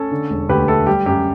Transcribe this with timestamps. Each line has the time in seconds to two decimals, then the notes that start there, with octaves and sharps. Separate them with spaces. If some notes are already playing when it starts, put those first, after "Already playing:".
Already playing: C#4 A4
0.11 D3
0.30 E1
0.49 D2 G4 B4
0.68 A3 A4
0.86 G3 G4
1.06 F#2 G4